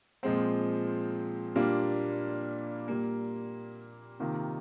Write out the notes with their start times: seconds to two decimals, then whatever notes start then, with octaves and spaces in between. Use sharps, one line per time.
0.23 A#2 F3 G#3 C4
1.55 A#2 G3 A#3 D4 F4
2.88 A#2 G3 A#3
4.20 C3 D#3 A#3 F4